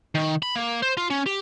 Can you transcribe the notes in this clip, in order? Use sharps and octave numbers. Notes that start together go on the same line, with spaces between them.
D#3
B5
A#3
C5
F4
C#4
G4